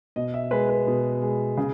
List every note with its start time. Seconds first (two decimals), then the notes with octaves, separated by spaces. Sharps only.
0.16 B2 D#5
0.34 E5
0.51 G#3 B4
0.69 B4
0.87 B2
1.22 G#3
1.57 C#3